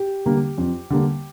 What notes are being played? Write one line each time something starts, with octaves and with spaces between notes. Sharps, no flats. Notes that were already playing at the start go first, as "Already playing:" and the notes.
Already playing: G4
D3 G3 A#3
F2
D3 G3 A#3